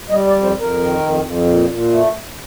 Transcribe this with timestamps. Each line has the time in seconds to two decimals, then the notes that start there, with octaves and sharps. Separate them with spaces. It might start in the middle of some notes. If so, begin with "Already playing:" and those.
0.09 G3 D#5
0.27 D5
0.32 F2
0.43 C5
0.55 F2
0.60 A#4
0.77 D#3
0.99 F2
1.22 F2
1.45 A#2
1.68 A#2
1.90 A3